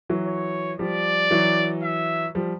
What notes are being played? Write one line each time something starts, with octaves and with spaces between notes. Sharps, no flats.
E3 F#3
C#5
F3 G3 D5
E3 F#3
E5
F3 G3